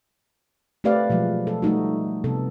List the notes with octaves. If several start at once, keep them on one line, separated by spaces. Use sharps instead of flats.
A3 C4 G4 B4 D5 F5
B2 F3 F#3 G#3
A4
G3 A3 D#4 F#4
C3 B3 A4